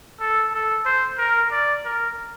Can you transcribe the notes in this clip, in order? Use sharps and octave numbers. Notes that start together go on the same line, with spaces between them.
A4
A4
C5
A#4
D5
A#4